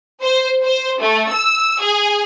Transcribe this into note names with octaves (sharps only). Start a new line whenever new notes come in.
C5
C5
A3
E6
G#4